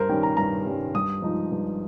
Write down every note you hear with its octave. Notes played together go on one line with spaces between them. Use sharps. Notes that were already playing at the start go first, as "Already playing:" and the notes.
Already playing: G2 A#4 C5
D#3 G3 C#4 G5
A#5
G2 A#5
D#3 G3 C#4
G2 D#6
F3 G#3 D#4
G2